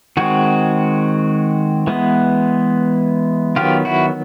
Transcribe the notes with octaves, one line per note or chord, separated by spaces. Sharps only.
D#3 G#3 C4 F#4 G#4
E3 G#3 B3
D#3 F#3 B3 F4 G4
E4 F#4